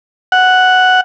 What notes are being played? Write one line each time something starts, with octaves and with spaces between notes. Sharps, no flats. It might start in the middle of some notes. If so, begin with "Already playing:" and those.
F#5